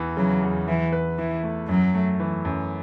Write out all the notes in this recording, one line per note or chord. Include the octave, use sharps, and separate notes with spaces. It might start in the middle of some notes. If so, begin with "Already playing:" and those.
Already playing: E2 E3
C#3 F#3
E2
E3 E5
B4
E3 E4
A3
F#2 F#3
A3
E3
F#2